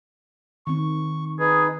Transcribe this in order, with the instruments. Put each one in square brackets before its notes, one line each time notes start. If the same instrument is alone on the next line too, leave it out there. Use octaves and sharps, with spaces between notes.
[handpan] D#3 C4 [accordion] C#6
[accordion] D#4 B4 [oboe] G#4